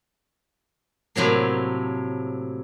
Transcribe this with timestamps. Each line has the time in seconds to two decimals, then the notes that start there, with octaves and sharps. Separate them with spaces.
1.16 A2 C3 F#3 A#3